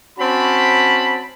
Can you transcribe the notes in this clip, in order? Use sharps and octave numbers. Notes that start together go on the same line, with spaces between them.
C4 C#4 F#4 A5 B5